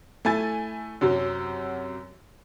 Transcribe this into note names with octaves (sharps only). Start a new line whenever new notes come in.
A3 E4 G#5 A6
F#2 C3 F#3